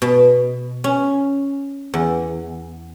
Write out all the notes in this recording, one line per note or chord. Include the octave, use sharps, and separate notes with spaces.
B2
C#4
E2